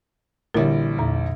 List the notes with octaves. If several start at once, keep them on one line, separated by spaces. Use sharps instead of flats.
A#1 D3 E3 G3 A#4
E2 A#2